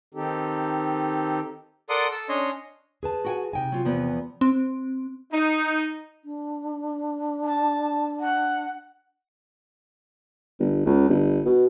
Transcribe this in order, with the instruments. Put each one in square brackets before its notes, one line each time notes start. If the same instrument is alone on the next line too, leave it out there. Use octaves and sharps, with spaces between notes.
[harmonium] D#3 C4 D#4 G4 A4
[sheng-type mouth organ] A4 A#4 D5 F#5 C6 D#6
A4 E6
C#4 D4 C#5 D#5 C6
[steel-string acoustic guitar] G#4 B4 A5
[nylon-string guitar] F#4 G5 G#5
[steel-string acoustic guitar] C3 G5 G#5 [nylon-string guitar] D#4
[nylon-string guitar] F#3 F4
E2 F3 B3
[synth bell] C4
[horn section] D#4
[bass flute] D4
[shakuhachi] A5
F#5
[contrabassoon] G1
C#2
G1
B2